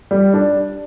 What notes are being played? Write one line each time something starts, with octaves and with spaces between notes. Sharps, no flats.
G3
D4